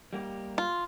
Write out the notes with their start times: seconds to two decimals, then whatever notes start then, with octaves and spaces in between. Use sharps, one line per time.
0.13 G3 A#3 G4
0.58 F4